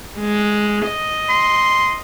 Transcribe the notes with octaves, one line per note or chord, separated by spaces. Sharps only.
G#3
D#5
C6